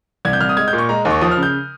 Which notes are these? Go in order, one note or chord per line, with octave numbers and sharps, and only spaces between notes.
C2 G#6
G6
C2 F6
D#6
G#3 G#6
G6
A#2
C#6
G#3 A#5
D#2
C#6
F3 D#6
F6
C#3
G6